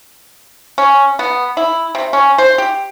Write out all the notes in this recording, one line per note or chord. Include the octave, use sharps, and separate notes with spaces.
C#4
B3
E4
C3
C#4
C5
G4